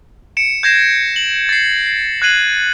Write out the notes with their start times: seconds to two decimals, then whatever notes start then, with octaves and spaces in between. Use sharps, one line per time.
0.37 C#7 D7 E7
0.63 G6 G#6 A#6 C7 E7
1.16 F#7
1.49 A6 C7
1.86 C7
2.22 F#6 G#6 C7 D#7 F#7